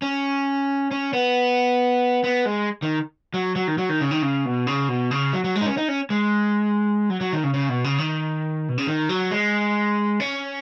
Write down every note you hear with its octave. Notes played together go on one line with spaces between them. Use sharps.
C#4
C#4
B3
B3
G#3
D#3
F#3
F#3
D#3
F#3
D#3
C#3
D#3
C#3
B2
C#3
B2
C#3
F#3
F#3
G#3
D#4
C#4
D#4
C#4
G#3
F#3
F#3
D#3
C#3
C#3
B2
C#3
D#3
B2
C#3
D#3
F#3
G#3
C#4